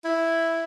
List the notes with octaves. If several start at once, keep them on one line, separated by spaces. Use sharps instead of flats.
E4